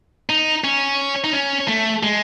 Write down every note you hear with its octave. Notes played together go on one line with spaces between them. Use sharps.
D#4
C#4
D#4
C#4
A3
G#3